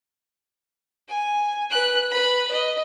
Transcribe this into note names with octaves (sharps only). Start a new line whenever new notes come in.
G#5
B4 F#6
B4 B5
D#5